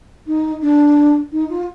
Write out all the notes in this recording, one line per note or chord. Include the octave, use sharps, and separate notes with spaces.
D#4
D4
D#4
F4